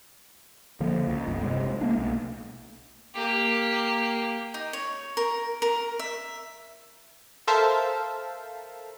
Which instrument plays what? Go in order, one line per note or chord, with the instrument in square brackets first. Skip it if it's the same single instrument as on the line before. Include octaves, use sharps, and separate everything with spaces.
[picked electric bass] D3 F3 A#3
C#2
G1
C3 G#3
A3 A#3 D4
B1
[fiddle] A#3 G4
[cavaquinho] D#4
C#5
A#4
A#4
E5
[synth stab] A4 A#4 C5 E5 F5 A5